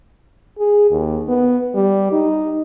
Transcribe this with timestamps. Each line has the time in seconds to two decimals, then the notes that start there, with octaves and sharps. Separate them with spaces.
0.59 G#4
0.91 D#2
1.28 B3
1.75 G3
2.12 D#4